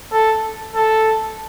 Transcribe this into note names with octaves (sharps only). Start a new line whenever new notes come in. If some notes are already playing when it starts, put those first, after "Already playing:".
A4
A4